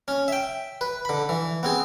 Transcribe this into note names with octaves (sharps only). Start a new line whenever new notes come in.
C#4
E5 G5
B4
D3 B5
E3
B3 C4 G#4